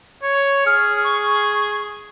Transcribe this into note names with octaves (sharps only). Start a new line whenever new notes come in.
C#5
G#4 F6
C#6